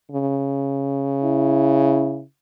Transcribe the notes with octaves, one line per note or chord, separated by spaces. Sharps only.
C#3
E4